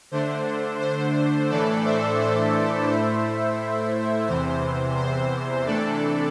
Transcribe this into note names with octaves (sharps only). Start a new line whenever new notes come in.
D3 A3 D4 C5
C5
A2 E3 A3 D4 A4 D5
C5 E5
C5 E5
A2 A3 E4 C5 E5
E2 C3 E3 C5
C5
C3 E3 A3 D4 A4 D5